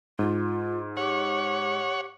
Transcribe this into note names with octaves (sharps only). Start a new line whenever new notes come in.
G#2 F4
G4 C#5 F#5